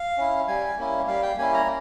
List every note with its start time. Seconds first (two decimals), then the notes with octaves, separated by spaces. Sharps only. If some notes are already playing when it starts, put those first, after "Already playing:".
Already playing: F5
0.18 C#4 E4
0.47 G3 G#5
0.78 A#3 C#4 E4
1.08 G3 F5
1.23 G5
1.38 A#3 C#4 E4 G#5
1.54 A#5